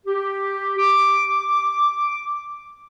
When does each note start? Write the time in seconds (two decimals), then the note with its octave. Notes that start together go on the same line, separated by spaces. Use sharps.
0.06 G4
0.78 D6